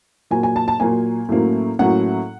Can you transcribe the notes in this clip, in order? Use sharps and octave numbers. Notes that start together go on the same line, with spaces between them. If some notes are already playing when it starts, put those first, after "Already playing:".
A#2 F#3 A#3 G#5
G#5
A5
A5
A#2 F#3 A#3 G#5
A2 F#3 A#3 C#4
A2 F#3 A#3 C#4 F#5